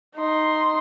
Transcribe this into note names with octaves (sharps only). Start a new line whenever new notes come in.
D#4 C6